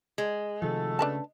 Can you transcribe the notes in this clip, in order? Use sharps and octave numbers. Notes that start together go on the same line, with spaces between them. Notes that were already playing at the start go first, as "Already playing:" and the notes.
G#3
C3 D#3 F3 A3 F#4 A4
C#3 D4 B4 A5